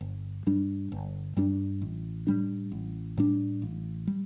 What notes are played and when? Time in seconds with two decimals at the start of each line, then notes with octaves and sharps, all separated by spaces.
0.01 G1
0.46 G2 G3 D4
0.92 G1
1.37 G2 G3 D4
1.82 A1
2.27 A2 G3 D4
2.72 A1
3.17 A2 G3 D4
3.62 A1
4.07 G3